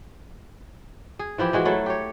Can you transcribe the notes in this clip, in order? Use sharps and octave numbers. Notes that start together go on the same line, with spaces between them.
G#4
E3 F3 E4 G4
E3 G#3 F#4
F#3 A3 E4
G4 C#5